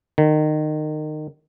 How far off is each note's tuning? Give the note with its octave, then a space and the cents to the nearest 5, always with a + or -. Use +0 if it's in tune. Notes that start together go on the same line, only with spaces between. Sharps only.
D#3 -25